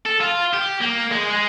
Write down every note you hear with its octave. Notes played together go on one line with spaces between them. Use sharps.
A4
F4
G4
A#3
G#3
G#3